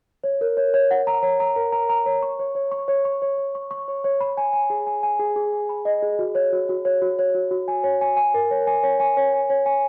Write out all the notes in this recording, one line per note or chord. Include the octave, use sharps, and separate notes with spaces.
C#5
A#4
C#5
C#5
F#5
A#5
C#5
A#5
A#4
A#5
A#5
C#5
C#6
C#5
C#5
C#6
C#5
C#6
C#5
C#5
C#6
C#6
C#5
C#5
B5
G#5
G#5
G#4
G#5
G#5
G#4
G#4
G#5
B5
D#5
G#4
F#4
C#5
F#4
F#4
C#5
F#4
C#5
F#4
F#4
G#5
C#5
G#5
G#5
A#4
C#5
G#5
C#5
G#5
C#5
G#5
C#5
G#5